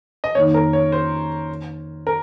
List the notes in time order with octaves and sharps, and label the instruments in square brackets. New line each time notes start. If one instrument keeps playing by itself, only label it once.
[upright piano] D#5
[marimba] F2 D#3 A#3 D#4 [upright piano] C#5
[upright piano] A#4
C#5
C5
A#4